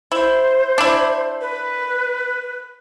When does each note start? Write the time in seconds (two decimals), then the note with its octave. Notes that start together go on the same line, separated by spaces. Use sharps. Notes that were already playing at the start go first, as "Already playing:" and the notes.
0.12 E4 C5
0.78 D4 E4
1.41 B4